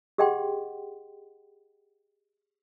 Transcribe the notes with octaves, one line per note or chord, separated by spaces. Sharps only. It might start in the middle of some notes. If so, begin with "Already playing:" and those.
G4 G#4 D#5 F#5 G5 C6